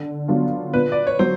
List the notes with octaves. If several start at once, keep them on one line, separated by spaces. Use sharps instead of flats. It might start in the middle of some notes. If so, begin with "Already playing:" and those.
Already playing: D3
F#3 B3 D4 F4
A#2 B4
D5
C#5
F#3 C5